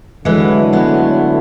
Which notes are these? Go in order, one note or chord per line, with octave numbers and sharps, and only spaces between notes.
D3 E3 F#3 G#3 A3 E4
G#3 B3